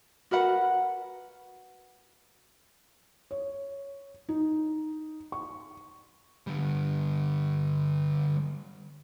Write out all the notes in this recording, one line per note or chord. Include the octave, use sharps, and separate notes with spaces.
F#4 A#4 B4 F#5
C#5
D#4
C#6
D3 G3